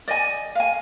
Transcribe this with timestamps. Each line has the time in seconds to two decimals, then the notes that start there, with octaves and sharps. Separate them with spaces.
0.08 D5 D#5 G#5
0.55 F5 G#5